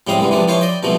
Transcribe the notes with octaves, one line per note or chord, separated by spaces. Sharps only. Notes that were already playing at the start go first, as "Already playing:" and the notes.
A2 G3 G#3 C4 F5 D#6
C2 D3 E3 G3 G#3
C3 E3 F3 G#3 D4
E3 F3 F4 C5 C#5
D5 D#5 G5
C2 B2 F3 G#3 A3